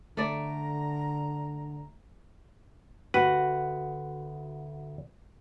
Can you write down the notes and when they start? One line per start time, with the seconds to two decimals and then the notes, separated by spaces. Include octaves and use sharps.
0.17 D3 A3 D5 A#5
3.14 D2 F#4 B4